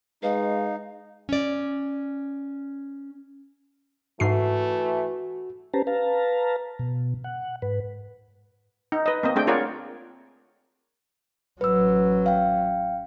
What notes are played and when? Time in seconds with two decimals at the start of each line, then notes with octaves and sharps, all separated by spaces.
0.23 G#3 D#4 B4 F5
1.29 C#4 D5
4.20 G#2 E3 A3 F#4 C7
5.74 C#4 G4 B4 C5 A5 A#5
5.87 B4 F5 A5 A#5
6.79 B2
7.24 F#5
7.62 G#2 B4
8.92 D#4
9.06 B4 D#5
9.23 A#3 C4 D#5
9.36 A3 C4 D4 G#4 G5
9.47 F4 G#4 A#4 C#5 D5 F#5
11.61 A1 F#3 B4 E6
12.26 F5 G5